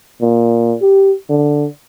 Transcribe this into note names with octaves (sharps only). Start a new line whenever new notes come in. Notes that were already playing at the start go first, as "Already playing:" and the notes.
A#2
G4
D3